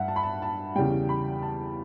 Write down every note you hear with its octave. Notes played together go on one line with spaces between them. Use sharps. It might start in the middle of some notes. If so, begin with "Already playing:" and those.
Already playing: G2 E5 F#5
A5
B5
A5
A5
E2 C#3 G3 G5
B5
A5